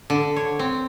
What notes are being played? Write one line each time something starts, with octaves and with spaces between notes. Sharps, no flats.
D3
C#5
C4